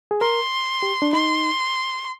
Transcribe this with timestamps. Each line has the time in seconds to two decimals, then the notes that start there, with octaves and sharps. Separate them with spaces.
0.11 G#4
0.21 A#4 C6
0.83 G4
1.02 D4
1.13 D#4 C6